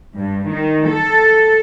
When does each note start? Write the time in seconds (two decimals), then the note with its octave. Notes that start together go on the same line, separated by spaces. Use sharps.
0.18 G2
0.50 D#3
0.89 A4